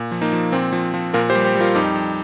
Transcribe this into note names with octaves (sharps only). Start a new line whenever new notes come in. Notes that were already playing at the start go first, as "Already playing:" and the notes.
Already playing: A#2
F3
A#3 D#4
F3
A#2 C4
F3
F3
A#2 F4 A#4
G4 C5
G3
G4 C5
G3
F4 A#4
F2 D#4 G4
F2